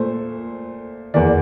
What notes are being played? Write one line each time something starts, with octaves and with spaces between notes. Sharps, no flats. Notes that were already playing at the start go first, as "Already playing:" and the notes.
Already playing: A#2 A3 C5
E2 E3 A#3 D5